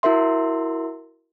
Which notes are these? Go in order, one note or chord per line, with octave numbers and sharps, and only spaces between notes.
E4 F#4 A#4 E5 C6